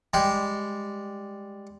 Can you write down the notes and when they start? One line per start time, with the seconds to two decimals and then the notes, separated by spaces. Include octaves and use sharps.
0.13 G3 G#3